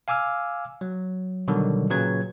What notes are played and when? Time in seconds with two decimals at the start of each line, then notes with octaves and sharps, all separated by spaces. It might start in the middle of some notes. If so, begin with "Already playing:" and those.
0.08 F5 G#5 D6 E6 F6
0.81 F#3
1.48 B2 D3 D#3 F#3 G3
1.90 A#2 C#3 F#3 B4 G#6